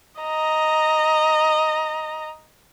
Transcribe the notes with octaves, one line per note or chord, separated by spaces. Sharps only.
D#5 A#5